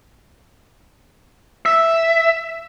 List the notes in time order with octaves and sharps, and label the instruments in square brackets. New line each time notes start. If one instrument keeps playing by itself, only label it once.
[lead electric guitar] E5